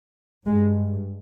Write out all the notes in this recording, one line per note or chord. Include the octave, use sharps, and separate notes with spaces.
G2 G#3